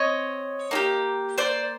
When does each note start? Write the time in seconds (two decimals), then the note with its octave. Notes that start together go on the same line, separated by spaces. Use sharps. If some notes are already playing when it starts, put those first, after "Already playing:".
Already playing: C4 C#5 D#5
0.71 A#3 D#4 G4
1.38 C5 D5